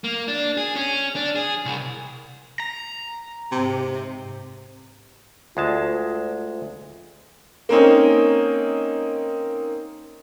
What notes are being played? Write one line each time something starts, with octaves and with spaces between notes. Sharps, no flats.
A#3
D4
G#4
C#4
D4
G#4
C2
A#5
G#2 C3
D2 G#3 F4 A5
A#3 C4 C#4 D#4